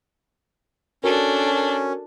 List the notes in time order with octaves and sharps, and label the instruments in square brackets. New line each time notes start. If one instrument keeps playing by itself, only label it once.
[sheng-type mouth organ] C#4 [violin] D4 A4 [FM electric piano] F#4 A#4